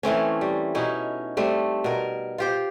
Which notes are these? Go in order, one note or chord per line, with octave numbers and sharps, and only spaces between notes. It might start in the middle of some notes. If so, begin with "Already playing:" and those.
E3 A3 C4 C#4
G3
B2 C#4 D#4 E4
G3 A3 C4
B2 A#4
F4 G4 C5